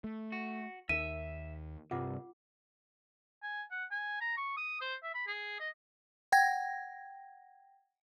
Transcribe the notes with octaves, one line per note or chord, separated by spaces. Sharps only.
A3
F#4
D#2 D#4 A#4 E5 D#7
C2 G2 F4 F#5 D6
G#5
F#5
G#5
A#5
C#6
D#6
C5
E5
B5
G#4
D#5
F#5 G5 G#6 A#6